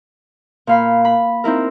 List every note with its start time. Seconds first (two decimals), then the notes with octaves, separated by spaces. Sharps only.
0.67 A#2 F5 B5
1.05 B5
1.44 C4 D#4 E4 A#4